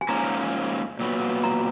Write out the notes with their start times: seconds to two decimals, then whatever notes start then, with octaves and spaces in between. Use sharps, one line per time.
0.01 G#5
0.09 G#2 F3 A#3 C#4 A#5
0.99 A#2 F#3 B3
1.44 A#5